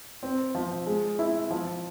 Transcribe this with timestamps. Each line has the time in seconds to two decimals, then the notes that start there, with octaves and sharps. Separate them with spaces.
0.23 C4
0.55 F3
0.86 G#3
1.19 E4
1.51 F3